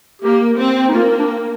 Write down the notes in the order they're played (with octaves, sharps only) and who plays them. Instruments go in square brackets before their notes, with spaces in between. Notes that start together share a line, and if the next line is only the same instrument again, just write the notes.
[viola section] A#3 [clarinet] G4
[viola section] C4
[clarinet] D#4
[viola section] A#3 [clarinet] F4
[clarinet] D4